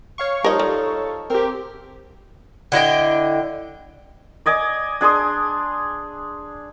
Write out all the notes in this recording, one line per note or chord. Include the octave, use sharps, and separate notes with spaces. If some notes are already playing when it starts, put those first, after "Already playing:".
C#5 F5 C#6
F3 G3 D#4 A#4 D#5
G3 A4
C4 G4 A#4
D3 E4 D#5 G5
D5 D#5 G#5 D6
D4 G#4 C6 D#6